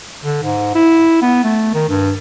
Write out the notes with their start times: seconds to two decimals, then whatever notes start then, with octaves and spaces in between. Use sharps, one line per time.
0.24 D3
0.43 G#2
0.75 E4
1.22 B3
1.44 A3
1.74 D#3
1.89 G2